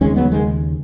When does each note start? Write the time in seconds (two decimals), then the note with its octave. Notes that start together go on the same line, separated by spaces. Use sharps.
0.01 D#2 C#3 G#3 C#4
0.16 F#3 B3
0.31 D#3 G#3